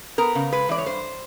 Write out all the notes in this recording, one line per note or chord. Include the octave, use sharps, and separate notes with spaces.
B3 A#4
C#3
G#3 B4
E3 D5
C#5
G2 C5